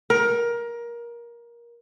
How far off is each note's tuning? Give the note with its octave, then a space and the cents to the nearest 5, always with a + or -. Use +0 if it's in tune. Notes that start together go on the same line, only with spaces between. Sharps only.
A#4 +20